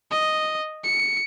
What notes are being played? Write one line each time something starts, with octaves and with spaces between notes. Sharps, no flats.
D#5
C#7